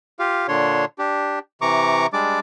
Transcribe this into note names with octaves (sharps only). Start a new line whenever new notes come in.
F4 G4 F5
A#2 D3 D4 C#5 C6
D4 G4
C3 E3 A#5 C#6 D6
G3 G#3 D4 D5 D6